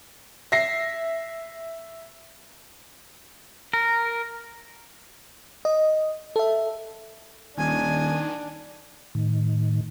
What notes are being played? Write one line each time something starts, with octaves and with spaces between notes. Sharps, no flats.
E5 A#6 C7
A#4
D#5
A4 E5
D#1 D#3 D4 G#5
A2 D#3